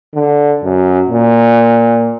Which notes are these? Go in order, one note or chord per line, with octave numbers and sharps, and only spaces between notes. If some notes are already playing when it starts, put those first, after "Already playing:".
D3
F#2
A#2